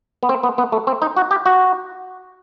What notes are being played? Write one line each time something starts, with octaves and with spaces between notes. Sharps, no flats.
B3
C4
B3
B3
A3
C4
D#4
F#4
G4
F#4